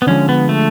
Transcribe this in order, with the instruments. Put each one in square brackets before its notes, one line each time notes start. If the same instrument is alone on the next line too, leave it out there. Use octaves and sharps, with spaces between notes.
[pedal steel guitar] B3
[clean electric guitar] D3 F3 G#3 [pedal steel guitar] C#4
[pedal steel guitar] B3
A3